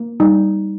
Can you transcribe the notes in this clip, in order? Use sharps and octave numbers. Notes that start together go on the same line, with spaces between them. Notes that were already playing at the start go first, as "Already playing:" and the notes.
Already playing: A#3
G3 D#4